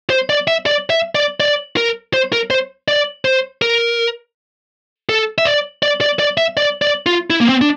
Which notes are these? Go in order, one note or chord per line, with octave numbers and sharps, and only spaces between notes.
C5
D5
E5
D5
E5
D5
D5
A#4
C5
A#4
C5
D5
C5
A#4
A4
E5
D5
D5
D5
D5
E5
D5
D5
F4
E4
A#3
C4
D4